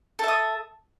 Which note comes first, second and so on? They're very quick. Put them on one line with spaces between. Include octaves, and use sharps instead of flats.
A4 E5 D#6